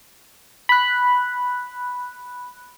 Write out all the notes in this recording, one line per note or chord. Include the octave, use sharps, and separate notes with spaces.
B5 F#6